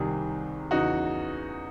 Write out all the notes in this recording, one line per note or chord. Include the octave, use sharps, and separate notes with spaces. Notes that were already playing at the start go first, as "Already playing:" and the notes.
Already playing: C2 C3 D#3 G#4
E2 C#3 E3 D#4 F#4